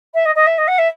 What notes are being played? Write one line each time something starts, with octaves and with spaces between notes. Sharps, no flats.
E5
D#5
D#5
E5
D#5
F#5
E5